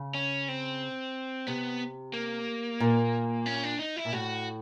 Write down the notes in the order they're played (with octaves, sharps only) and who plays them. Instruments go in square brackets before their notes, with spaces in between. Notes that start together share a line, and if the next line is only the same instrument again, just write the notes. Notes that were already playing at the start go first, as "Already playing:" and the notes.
Already playing: [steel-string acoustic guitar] C#3
[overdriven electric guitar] C#4
C4
[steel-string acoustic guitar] C3 [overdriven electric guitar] B3
[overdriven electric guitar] A#3
[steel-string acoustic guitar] A#2
[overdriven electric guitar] C#4
D4
D#4
E4
[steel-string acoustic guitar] A#2
[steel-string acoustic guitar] A2 [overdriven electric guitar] F#4